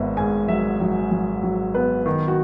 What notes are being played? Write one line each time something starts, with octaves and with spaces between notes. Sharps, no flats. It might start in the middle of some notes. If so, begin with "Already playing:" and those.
Already playing: G#1 B3 D#5 E5
G#2 G#5
F#3 E5
F#3
F#3
F#3
B3 B4
D#3
F#4